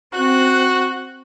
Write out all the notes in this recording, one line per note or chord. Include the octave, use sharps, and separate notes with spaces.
C4 F#4 F#6